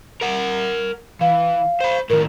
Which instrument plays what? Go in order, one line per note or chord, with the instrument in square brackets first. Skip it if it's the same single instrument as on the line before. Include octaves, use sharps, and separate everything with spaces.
[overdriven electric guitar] A#4 F#5
[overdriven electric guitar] E3 [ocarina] F5
[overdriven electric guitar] C5 B5
[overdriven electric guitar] A2 D#3 [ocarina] A#4